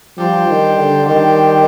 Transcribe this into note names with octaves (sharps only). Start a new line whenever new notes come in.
F3 G3 D4 G4 C5
D#3
D3
D#3 G3 D4 G4 C5